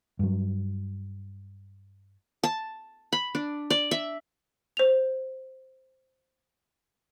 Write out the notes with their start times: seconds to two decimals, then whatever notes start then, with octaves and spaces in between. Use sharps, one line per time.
0.19 G2 F#3
2.43 A5
3.12 B5
3.35 D4
3.70 D5
3.91 E5
4.77 C5 F7